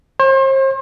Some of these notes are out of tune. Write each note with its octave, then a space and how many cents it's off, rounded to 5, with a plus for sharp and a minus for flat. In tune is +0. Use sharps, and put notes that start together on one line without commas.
C5 +40